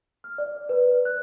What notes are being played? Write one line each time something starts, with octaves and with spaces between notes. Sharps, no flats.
F6
D5
B4
F#6